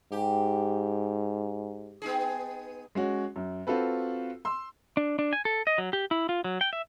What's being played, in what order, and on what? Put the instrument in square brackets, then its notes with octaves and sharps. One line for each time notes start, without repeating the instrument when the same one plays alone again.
[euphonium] G#2 [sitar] G4
[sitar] B3 D#4 G#4
[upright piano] G#3 C#4 F#4
F#2
C4 F4 F#4 A4 B4
C6 E6
[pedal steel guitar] D4
D4
G#5
A4
D#5
F#3
G4
E4
F4
F#3
G5
E5